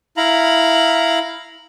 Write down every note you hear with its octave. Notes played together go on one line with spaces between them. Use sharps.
E4 F5 A#5 B5